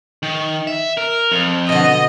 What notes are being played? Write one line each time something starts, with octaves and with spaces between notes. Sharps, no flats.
D#3
E5
A#4
F2
B2 D3 D#5